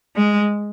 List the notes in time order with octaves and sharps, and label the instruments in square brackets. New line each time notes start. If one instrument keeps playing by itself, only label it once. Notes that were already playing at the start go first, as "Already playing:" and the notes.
[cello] G#3